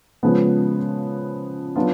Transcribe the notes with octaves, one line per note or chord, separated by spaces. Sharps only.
C#3 F3 G#3 B3
F#3 B3 D4 F4